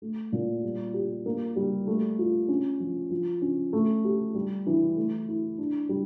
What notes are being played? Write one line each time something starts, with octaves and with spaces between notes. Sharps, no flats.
A3
A#2
G3
G4
A#3
G3
A3
F4
C#4
F3
F3
C#4
A3
G4
G3
E3
A3
E4
D4
G3